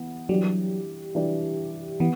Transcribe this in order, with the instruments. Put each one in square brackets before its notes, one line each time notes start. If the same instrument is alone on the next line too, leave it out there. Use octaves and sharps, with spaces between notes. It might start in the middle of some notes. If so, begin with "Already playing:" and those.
Already playing: [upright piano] E3 B3
[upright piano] E3 G3 D4 G4 [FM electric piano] F#3
[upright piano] E3 G3 D4 G4
[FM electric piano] E3 [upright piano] B3